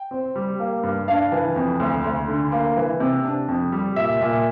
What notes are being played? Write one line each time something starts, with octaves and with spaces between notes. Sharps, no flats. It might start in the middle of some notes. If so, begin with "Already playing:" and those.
Already playing: G5
C4
G3
A#3
G2
D4 F5
E3
F2
D2
D2
D3
A#3
E3
C3
D4
F2
G3
A#2 E5
A#2 E5